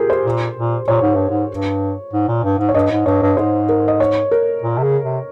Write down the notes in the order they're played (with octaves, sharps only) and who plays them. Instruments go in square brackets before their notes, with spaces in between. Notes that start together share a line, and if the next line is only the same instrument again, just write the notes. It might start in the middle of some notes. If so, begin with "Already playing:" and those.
Already playing: [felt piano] F4 G4 G#4 A#4
C5
[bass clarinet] A#2
A#2
[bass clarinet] A#2 [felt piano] C#5
[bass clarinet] G#2
G2
G#2
G2
G#2
A#2
G2
G#2
[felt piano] C#5
[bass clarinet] G2 [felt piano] D#5
[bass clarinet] G#2
[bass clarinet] G2 [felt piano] C#5
[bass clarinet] G2
[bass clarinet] G#2 [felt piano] C5
[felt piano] A#4
D#5
C#5
A#4
[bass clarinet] A#2
C3
C#3
C3